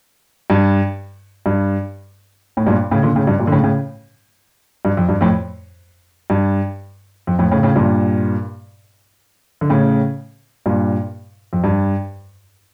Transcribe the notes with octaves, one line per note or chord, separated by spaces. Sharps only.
G2
G2
A2
G2 A#2
A2 C#3
A#2 D3
A2 C#3
G2
G2 A#2
D3
A2 C#3
A2 C#3
G2
F2
G2
F2 A2
G2
F2
F2 A2
A2 C#3
A2 C#3
G2 A#2
D3
A2 C#3
G2 A#2
F2
G2